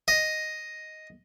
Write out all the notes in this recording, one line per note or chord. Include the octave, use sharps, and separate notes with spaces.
D#5